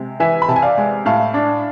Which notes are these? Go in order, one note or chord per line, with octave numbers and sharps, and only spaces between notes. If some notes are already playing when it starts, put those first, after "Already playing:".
Already playing: C3 G#3
E3 E5 G#5
B5
C3 A5
G#5
D5 F5
G#3
A2 F5 A5
D4